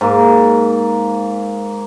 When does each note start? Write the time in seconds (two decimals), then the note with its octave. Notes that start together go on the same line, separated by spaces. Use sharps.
0.01 G#2 A#3